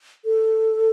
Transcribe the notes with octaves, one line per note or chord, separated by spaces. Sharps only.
A4